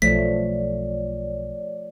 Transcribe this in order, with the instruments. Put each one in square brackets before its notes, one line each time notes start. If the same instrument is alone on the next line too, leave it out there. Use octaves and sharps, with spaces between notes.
[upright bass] B1 [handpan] F3 A3 [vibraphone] C#5 D5 [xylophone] B6